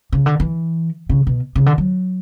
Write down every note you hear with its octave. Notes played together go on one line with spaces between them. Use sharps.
C#3
D3
E3
C#3
B2
C#3
D3
F#3